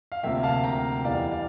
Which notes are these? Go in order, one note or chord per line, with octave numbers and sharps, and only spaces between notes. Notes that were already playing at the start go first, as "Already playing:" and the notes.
F5
D2 C3 F3 A#3 E5 G5
F5 A5
G5 A#5
E2 E3 G3 D5 F5
D5 F5